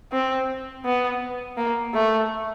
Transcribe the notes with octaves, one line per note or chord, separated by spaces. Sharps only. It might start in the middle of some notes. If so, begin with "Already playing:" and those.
C4
B3
A#3
A3